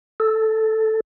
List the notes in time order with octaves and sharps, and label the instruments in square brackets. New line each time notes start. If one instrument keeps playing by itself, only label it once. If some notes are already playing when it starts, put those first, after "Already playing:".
[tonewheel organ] A4